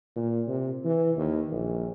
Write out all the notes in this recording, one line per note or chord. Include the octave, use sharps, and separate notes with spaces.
A#2
C3
E3
D#2
A#1